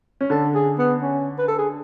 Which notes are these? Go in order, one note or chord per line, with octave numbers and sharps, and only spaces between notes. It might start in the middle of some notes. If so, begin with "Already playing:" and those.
C#4
D3 D4 A4
G#4
B3
C#4
B4
A4
G#4